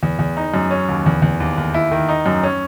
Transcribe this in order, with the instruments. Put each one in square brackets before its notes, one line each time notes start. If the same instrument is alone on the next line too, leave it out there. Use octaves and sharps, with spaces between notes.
[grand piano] E2
E2
D#4
F#2
C#4
D#2
E2
E2
D#2
D#2
E4
D#3
D#4
F#2
C#4